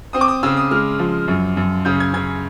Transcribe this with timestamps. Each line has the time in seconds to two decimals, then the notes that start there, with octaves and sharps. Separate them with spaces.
0.13 C4 D#6
0.21 D6
0.28 D#6
0.43 C#3 E6
0.57 D#6
0.71 G#3 F6
0.99 F3
1.28 F#2
1.57 F#2
1.85 C#3 G6
2.00 G#6
2.14 C#3 G#6